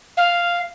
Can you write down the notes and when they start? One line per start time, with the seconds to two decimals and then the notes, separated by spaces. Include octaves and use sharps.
0.17 F5